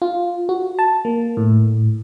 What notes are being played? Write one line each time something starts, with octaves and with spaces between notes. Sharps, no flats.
F4
F#4
A5
A#3
A2